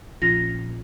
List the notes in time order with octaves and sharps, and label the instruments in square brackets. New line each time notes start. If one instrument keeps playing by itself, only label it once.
[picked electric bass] A#1 [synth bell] F3 C#4 F4 [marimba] A#6